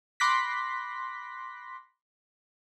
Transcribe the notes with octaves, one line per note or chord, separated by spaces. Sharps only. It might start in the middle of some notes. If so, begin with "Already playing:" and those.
B5 C6 D6 F#6 A#6 B6